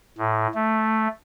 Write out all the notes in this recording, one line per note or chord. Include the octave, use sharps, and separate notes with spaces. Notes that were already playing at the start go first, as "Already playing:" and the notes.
A2
A3